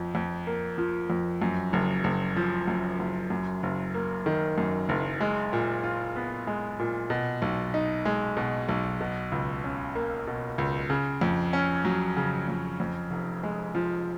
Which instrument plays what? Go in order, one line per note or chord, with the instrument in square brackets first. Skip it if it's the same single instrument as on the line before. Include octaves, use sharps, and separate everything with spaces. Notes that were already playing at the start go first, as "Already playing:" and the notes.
Already playing: [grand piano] F2 F3
F2
A#3
F3
F2
F#2
F#1
F#1
F3
F#2
F#1
F#2
F#1
A#3
D#3
F#2
F#1
G#3
A#2
F4
B3
G#3
A#2
B2
B1
D#4
G#3
B2
B1
B2
C#2
C#4
A#3
B2
C#2
C#3
F2
C#4
F#3
C#3
F2
F2
F1
G#3
F3